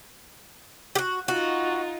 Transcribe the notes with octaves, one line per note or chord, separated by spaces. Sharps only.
F#4 G4
D#4 F4 F#4